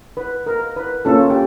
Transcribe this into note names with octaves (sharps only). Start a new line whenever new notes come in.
B4
A#4
B4
A#3 C#4 F4 A4
G4